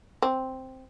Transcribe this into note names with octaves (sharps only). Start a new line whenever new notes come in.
C4